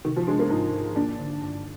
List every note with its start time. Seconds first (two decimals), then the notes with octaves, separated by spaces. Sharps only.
0.05 C3 D#3
0.16 F3
0.27 G#3 D4
0.39 A#3
0.50 G#2 D#4
0.73 G#2
0.96 A#3 D4
1.19 D3
1.42 G2